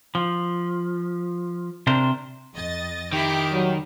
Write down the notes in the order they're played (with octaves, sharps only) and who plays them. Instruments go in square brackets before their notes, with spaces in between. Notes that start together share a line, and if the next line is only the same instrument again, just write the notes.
[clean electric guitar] F3
C3 D4 A#4 C5
[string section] F2 D#5 A6
[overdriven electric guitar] D#3 [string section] E4 D6 [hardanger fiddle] G4
[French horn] F#3 [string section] G3